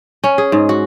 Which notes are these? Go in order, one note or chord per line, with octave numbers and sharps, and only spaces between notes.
C#4
G#4
G#2
F#4